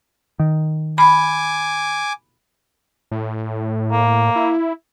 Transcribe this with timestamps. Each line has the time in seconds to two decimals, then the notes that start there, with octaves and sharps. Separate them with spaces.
0.40 D#3
0.98 G#5 B5 D6
3.11 A2
3.92 A#3
4.36 E4